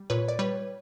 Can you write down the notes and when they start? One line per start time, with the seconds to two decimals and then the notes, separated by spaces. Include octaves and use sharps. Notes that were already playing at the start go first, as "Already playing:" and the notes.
Already playing: G3
0.10 A#2 B4 C#5
0.28 D5
0.39 G3 B4 C#5